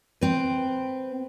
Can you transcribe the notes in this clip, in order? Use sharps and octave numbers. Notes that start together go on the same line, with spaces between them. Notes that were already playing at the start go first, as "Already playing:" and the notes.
C4 B4